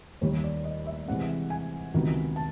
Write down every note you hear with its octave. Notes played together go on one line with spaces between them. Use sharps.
D#2 D#3 G3 C#5
D5
D#5
E5
C3 E3 G#3 C4 F#5
G#5
C#2 C3 D#3 F#3 B3
A5